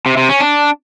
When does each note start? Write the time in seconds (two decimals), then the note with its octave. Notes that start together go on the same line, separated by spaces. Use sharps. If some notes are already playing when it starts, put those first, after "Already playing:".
0.06 C3
0.17 C3
0.29 C#4
0.40 D4